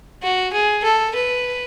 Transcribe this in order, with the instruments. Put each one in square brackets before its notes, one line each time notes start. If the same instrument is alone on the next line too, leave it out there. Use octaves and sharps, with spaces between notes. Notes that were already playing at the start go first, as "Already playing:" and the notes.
[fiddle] F#4
G#4
A4
B4